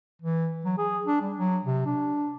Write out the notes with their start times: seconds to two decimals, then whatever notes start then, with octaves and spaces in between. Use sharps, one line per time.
0.22 E3
0.65 F#3
0.78 G#4
1.06 D4
1.21 G3
1.38 F#3
1.65 C3
1.86 D4